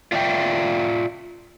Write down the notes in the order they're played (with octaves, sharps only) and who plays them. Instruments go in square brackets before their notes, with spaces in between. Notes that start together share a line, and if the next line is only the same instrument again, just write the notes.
[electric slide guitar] F4 D5 E5 G5